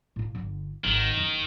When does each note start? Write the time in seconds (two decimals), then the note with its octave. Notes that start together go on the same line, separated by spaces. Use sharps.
0.16 A2 F4
0.35 G1 D3
0.84 G#1 D#3
1.17 F#1